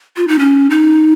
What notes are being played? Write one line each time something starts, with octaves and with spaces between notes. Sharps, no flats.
F4
D#4
C#4
D#4